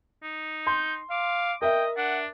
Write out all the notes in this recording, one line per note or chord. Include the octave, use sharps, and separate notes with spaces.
D#4
C6 G6
F5 D6
A#4 D#5 E5 G5
D4 F#5